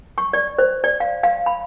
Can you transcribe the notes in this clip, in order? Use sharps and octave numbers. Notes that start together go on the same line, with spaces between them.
C#6
D5
C5
D5
F5
F5
B5